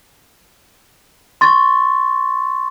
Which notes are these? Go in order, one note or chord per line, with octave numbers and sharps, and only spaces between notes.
C6 C#6 A6